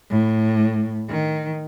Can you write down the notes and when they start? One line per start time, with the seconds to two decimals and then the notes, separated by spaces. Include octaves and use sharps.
0.11 A2
1.09 D#3